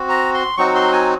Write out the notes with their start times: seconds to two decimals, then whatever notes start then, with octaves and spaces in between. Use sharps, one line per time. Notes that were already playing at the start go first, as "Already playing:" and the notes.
Already playing: C4 F#4
0.09 A#5
0.34 C6
0.57 F#3 C4 D#4 F#4 C#6
0.75 C6
0.93 G#5